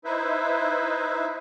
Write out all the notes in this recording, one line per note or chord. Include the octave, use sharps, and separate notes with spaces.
D#4 E4 B4 C5 E5